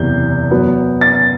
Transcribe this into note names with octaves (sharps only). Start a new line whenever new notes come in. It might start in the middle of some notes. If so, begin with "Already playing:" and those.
Already playing: F#1 E2 C3 G6
F#2 F#3 B3
A6